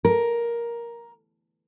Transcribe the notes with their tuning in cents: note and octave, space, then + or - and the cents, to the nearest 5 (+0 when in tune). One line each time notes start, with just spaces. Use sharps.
A#4 +10